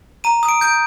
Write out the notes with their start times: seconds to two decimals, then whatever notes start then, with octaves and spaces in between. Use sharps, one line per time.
0.24 A#5 D#7
0.43 D#6
0.49 D7
0.61 G6 D7